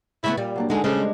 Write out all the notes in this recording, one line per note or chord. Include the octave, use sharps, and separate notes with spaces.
C#3 A3 B3 E4
A#2 G3
F#3 A#3 D4
D3 G#3 D#4 G#4 G#5
C#3 G3 G#3 D4 A4 C5